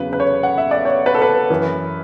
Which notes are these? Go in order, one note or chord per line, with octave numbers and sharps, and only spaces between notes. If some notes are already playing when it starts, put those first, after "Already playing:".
Already playing: E2 C#3 F#3 B4
B4
C#5
F#5
E5
D5
C#5
B4
A4
B4
F#2 E3